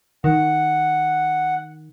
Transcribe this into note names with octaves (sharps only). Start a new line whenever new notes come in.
D#3 F#5